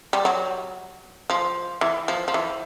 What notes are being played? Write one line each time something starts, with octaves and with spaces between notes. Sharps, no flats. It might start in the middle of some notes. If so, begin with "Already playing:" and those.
G3
F#3
F3
E3
F3
F3
E3